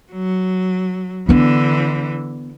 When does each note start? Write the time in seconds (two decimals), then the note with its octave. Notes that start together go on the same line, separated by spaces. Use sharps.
0.12 F#3
1.29 D3 E3 B3 D4